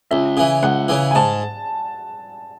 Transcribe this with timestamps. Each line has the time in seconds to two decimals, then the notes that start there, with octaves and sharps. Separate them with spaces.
0.11 C#2 E5
0.37 C#3 E3
0.63 C#2 F#5
0.88 C#3 E3
1.11 G#5
1.15 G#2 A5